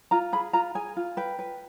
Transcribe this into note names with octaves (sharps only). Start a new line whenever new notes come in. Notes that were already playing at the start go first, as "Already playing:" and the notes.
F4 A#5
G#4 B5
F4 A#5
G#4 G#5
F4
B4 G5
B4